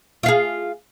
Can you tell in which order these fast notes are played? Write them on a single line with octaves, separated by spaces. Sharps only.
F4 F5 G#4